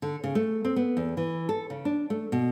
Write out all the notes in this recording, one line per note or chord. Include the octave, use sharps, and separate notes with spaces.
D3
C#3
A3
C4
B3
E2
E3
A4
C#3
D4
A3
B2